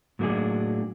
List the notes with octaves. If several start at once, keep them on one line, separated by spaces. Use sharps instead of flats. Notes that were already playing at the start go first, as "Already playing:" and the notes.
A2 F#3 A#3 C4 D4 G#4